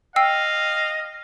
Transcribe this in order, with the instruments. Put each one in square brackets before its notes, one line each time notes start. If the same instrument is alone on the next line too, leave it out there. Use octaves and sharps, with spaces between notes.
[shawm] D#5 [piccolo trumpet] F5 [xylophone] G5 E6 C7